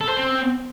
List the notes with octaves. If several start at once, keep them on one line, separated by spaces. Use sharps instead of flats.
A4
C5
C4